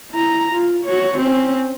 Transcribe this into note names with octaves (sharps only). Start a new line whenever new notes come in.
E4 A#5
F4
F#4 C#5
C4 C#4